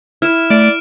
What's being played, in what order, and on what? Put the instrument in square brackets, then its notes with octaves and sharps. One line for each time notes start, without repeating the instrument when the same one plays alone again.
[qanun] E4 [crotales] F6 E7
[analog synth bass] A3 [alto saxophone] D5 [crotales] F6 D7